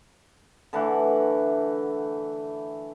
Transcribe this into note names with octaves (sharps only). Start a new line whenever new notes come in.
D3 E3 A3 F#5